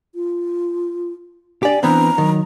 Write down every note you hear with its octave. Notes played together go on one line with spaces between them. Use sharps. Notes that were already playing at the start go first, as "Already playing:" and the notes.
F4
D4 G4 D5 G#5
E3 B3 C4 D4 A#5
D#3 F#3